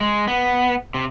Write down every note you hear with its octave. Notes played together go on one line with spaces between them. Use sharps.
G#3
B3
C3